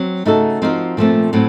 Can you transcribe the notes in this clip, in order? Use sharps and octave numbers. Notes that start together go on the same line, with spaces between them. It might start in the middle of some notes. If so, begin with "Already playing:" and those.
Already playing: F#3 C4
C#3 A3 D#4 F#4 A4
F3 C4 D#4 F#4 A#4
A#2 F3 A3 C4
A2 F#3 C4